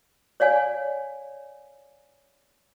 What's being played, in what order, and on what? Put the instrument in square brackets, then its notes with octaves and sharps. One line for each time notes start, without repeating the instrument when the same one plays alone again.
[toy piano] C#5 D5 F5 G#5